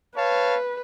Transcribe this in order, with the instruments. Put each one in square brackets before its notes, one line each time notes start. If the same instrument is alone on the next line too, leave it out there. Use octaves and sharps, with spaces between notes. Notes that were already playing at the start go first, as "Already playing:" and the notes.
[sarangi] B4 [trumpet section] C#5 F5 A5